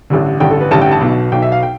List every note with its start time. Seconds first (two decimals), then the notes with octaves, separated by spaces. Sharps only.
0.10 A1 G2 D3
0.40 A1 G2 D3 G5
0.51 A4
0.61 B4
0.71 A1 G2 D3 A5
0.81 G5
0.92 A5
1.01 B1 B2
1.32 B1 B2 G5
1.42 E5
1.52 F5
1.63 G5